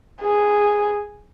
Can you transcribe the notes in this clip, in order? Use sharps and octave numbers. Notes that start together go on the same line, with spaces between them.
G#4